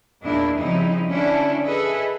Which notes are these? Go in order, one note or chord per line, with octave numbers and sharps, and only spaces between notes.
E2 A#2 D#3 A#3 D4 E4
C#3 F3 G3 C4 D#4 E4
D3 C#4 D4 E4
G#4 A4 B4 D#5 E5